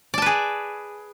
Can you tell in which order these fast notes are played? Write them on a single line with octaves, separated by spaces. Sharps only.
D5 A5 B4 G#4